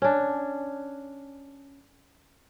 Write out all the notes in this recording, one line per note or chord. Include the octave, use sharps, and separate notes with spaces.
C#4 D4